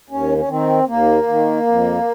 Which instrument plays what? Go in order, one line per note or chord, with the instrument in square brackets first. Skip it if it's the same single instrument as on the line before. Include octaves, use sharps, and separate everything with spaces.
[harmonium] D#2 C#4
C#4
D#3 C4
D#2 A#3
D#3
F2